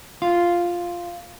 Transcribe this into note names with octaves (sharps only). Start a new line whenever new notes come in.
F4